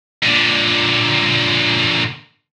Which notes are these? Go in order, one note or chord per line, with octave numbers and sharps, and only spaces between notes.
A#2 D3